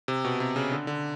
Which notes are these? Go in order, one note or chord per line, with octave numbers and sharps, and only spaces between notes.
C3
B2
C3
C#3
D3
D3